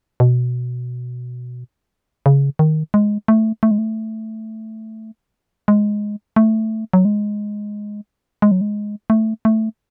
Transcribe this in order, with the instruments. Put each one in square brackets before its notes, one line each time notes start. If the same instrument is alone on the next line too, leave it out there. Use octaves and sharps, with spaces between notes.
[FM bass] B2
C#3
D#3
G#3
A3
A3
G#3
A3
G#3
A3
F#3
G#3
G#3
F#3
G#3
A3
A3